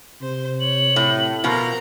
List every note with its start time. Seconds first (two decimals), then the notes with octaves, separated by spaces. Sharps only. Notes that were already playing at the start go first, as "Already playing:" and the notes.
0.22 C3 C5
0.61 C#5 F#7
0.96 A2
1.44 B2 F3 A#4 A#5